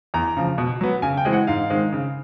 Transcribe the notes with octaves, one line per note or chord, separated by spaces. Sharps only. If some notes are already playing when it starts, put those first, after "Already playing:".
E2 A#5
C#3 F3
B2
F#3 B3
C#3 G#5
G5
E3 G#3 C4
F#5
G#2 F5
D#3 G#3 C4
C#3